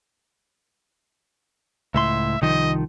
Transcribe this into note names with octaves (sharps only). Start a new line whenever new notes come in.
C#2 A2 E5 C6
C2 D#3 F3 D#5